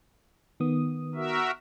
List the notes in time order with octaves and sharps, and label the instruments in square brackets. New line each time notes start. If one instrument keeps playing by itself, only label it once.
[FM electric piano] D#3 B3 D#6
[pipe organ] F#4 A#4 E5